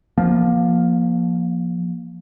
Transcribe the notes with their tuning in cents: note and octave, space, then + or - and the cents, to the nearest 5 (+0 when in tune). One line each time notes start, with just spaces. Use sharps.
F3 +0 A#3 +25